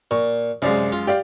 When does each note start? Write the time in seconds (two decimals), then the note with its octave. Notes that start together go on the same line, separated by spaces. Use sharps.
0.11 A#2 C#6
0.62 F#2 C3 G#3 D5 F5
0.92 F4
1.07 G4 D5 F5